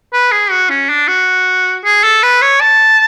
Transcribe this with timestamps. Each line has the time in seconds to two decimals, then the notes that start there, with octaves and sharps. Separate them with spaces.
0.13 B4
0.32 G#4
0.51 F#4
0.70 C#4
0.89 D4
1.08 F#4
1.85 G#4
2.04 A4
2.23 B4
2.42 C#5
2.61 A5